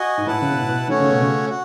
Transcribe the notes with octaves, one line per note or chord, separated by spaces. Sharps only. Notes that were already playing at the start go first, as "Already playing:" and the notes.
Already playing: F#4 D#5 G#5
G#2
A2 E4 B4 F#5 A5
C#3
B2
A2
B2
D#3 A3 C#4 F#4 C#5
C#3
B2
C#3
F#4